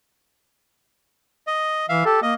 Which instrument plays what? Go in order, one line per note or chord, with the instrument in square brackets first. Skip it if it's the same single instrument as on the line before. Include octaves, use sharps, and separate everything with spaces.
[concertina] D#5
[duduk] E3 [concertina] E5 F5
[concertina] G4 [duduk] A4
[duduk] A#3 [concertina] D#5